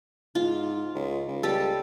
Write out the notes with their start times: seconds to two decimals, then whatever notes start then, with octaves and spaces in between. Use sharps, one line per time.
0.35 G#2 F4
0.95 C#2
1.28 C#2
1.43 G3 A4